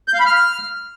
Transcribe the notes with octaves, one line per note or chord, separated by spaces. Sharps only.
G6
F5
B5
F6